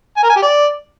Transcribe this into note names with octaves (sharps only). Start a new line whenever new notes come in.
G#5
A#4
G#5
G4
D5